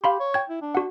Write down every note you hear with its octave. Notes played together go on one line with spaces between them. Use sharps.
G4 F5 B5 C6
C#5
G5 G#6
E4
D4
F#4 F#5